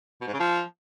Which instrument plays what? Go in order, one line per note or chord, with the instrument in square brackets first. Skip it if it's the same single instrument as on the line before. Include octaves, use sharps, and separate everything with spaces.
[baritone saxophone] B2
G#2
C#3
F3